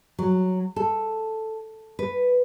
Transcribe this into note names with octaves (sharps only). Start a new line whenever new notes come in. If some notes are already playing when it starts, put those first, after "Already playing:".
F#3
A4
B4